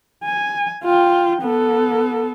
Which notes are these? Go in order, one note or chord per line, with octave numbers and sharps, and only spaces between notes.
G#5
F4 G5
B3 A4